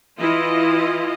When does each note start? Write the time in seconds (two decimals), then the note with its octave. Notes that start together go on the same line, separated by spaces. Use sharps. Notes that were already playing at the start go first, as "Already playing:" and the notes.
0.19 E3 E4 F4 D#5